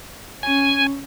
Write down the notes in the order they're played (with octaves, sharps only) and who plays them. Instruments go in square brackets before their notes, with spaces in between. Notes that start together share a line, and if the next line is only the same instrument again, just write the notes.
[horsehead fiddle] C#4 [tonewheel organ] G#5